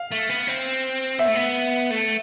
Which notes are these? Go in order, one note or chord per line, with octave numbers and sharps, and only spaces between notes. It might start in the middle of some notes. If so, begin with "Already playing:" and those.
Already playing: F5
A3
B3
C4
B3 E5
A3
B3
A3